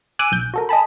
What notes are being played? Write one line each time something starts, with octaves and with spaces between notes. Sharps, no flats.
G#5 D6 E6 F#6 D7 D#7
B1 G6
F#4 A4 A#4
D#5 G#5 A5 B5